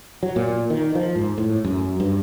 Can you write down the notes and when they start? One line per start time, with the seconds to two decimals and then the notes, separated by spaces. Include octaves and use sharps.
0.23 F#3
0.36 A#2
0.70 D#3
0.95 F3
1.16 G#2
1.38 A2
1.65 F#2
2.00 G2